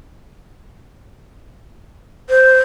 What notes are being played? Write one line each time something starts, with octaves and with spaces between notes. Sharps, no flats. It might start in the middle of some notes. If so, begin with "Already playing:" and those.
C5